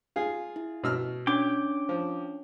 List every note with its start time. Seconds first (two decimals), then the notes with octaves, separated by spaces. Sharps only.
0.16 F4 G#4
0.56 E4
0.84 B2 E6 F6
1.27 C#4 D4 C#5 G5 D6
1.89 F3